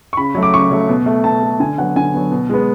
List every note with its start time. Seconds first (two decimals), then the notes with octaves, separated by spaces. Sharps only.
0.13 C#6
0.17 C#3 B5
0.35 F#3 A3
0.43 D6
0.54 C#3 C#6
0.71 F#3 A3
0.89 B2
1.06 A3
1.24 B2 A5
1.43 A3
1.60 D3 G#5
1.78 F#3 B3 F#5
1.96 D3 G#5
2.14 F#3 B3
2.31 B2
2.50 G#3 B3